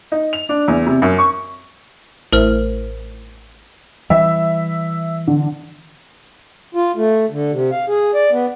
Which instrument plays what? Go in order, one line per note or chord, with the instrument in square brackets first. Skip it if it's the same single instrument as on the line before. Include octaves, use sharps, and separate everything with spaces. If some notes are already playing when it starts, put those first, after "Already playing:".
[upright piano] D#4
F7
D4
E2
C3
F#2
C#6
[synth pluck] A1 [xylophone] A#4 C5 F6
[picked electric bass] E3 G3 [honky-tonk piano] E5
[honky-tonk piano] D3
[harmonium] F4
A3
D3
C3
F5
G#4
D5
B3